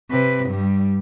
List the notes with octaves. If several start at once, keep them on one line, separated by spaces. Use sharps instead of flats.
C3 B4
G2 G3